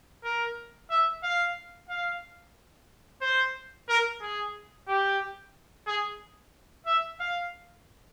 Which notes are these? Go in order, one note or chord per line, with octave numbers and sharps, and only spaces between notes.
A#4
E5
F5
F5
C5
A#4
G#4
G4
G#4
E5
F5